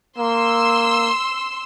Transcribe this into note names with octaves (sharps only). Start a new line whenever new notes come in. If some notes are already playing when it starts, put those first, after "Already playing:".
A#3 C6 E6